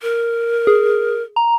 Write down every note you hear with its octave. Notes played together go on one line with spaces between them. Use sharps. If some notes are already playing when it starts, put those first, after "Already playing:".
A#4
G#4
A#5